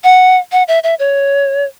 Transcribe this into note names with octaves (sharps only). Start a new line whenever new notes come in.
F#5
F#5
E5
E5
C#5